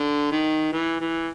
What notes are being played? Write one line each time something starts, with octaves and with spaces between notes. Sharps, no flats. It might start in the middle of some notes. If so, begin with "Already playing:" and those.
Already playing: D3
D#3
E3
E3